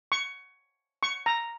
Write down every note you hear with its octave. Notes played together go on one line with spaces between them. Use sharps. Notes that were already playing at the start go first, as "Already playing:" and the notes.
C#6
C#6
A#5